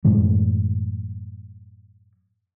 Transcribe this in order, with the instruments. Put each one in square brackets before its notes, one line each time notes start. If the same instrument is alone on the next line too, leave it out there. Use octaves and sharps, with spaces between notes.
[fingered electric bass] F#2 A2 E3 G#3